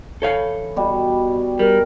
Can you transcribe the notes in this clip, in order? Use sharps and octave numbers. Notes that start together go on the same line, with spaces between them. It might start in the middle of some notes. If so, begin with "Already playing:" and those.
E3 A4 C#5 F5
B2 G3
G3 A#4